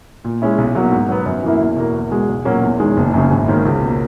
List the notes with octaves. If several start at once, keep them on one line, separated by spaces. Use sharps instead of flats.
A#2
G#3 C#4 E4
B1
B2 F#3 A#3
G#2
F#3 B3
F#2
E3 A#3 E4
E2
B2 A#3
E2
B2 G#3
B1
A#2 F#3 A#3 C#4
E2
D#3 G#3
F#1
F#2 C#3
G#1
G#2 D#3 A#3 C#4
C#2
B2 A#3